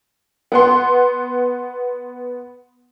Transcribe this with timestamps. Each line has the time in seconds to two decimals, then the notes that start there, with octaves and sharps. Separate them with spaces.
0.52 B3 F#5 C6